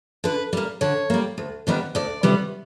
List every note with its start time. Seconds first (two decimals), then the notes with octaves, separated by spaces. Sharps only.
0.24 D3 B4
0.53 G3 A#3
0.81 D3 C#5
1.10 G3 A#3
1.38 D2
1.67 C3 D#3 G3 B3
1.95 D2 D5
2.23 C3 D#3 G3 B3